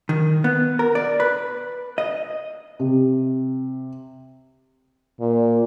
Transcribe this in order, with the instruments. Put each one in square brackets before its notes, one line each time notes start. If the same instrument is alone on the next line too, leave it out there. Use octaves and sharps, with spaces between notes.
[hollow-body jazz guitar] D#3
B3
A#4
D5
B4
D#5
[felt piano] C3
[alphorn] A#2